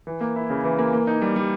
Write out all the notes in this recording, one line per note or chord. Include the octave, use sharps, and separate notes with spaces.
E3
A#3
E4
C#3
E3
A#3
A#3
D#4
G3
G3